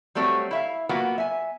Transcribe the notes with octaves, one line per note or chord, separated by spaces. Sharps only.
F#3 G3 A3 C4 F#4 C#5
E4 E5 F5
F#3 A#3 B3 F4 F#4
E5 G#5